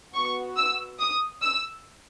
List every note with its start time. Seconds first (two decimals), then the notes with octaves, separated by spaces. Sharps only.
0.13 B3 F#4 C#6
0.56 E6
0.99 D#6
1.43 E6